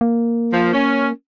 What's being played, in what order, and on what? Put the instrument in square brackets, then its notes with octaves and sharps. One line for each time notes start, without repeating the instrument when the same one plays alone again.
[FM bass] A#3
[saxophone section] F3
C#4